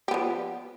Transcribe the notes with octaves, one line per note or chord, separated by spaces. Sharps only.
F3 B3 G4